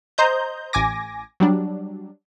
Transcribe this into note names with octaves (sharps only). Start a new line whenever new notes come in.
C5 D#5 A#5 G6
A1 G#5 D6 A#6
F#3 G3 D4